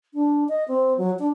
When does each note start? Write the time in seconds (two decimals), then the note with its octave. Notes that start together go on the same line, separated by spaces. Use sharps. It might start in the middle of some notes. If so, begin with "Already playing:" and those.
0.14 D4
0.49 D#5
0.68 C4
0.98 F#3
1.19 D4